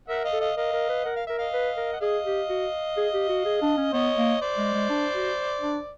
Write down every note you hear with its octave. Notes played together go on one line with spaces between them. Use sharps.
A#4 E5 F#5
D#5 F5
A4
D#5 F5
A#4 D#5 F5
A#4
B4
A#4 F#5
F5
A#4 E5
D#5 F5
B4
A#4
F#5
G#4 D#5 F5
G4
F#4
G#4
G4
F#4
G#4
D4
C#4
B3 C#5 D#5
A#3
C5 D5
G#3
G#3
D4
F#4
D4